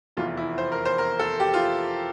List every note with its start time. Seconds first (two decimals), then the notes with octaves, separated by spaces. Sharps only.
0.17 F1 E2 E3 F4
0.37 E4
0.58 C5
0.72 A#4
0.85 C5
0.98 A#4
1.19 A4
1.40 G4
1.54 F4